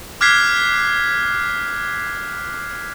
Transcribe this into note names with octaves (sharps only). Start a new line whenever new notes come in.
D6 F6 F#6 G#6 B6 C7